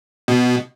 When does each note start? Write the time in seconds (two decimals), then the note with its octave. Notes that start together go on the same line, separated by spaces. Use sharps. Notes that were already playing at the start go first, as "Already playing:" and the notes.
0.28 B2